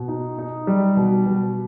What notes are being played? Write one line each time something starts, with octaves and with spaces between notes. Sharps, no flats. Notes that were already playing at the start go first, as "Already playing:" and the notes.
Already playing: B2
D#4
D#4
G3
B2
B2